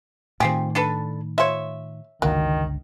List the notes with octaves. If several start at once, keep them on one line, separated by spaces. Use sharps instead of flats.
A2 D#3 C4 F4 G4 G#4
D4 A4 B4
F4 C5 C#5 E5
G1 C#2 D3 D#3 F#3 A#3